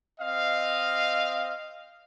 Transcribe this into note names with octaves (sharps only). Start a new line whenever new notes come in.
C4 D#5 F5